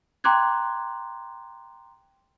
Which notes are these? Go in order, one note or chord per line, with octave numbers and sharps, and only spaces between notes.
G5 A#5 C6 D6 F#6 G#6